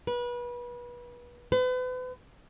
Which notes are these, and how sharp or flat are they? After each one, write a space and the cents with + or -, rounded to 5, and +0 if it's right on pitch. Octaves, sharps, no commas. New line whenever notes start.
B4 -30
B4 +40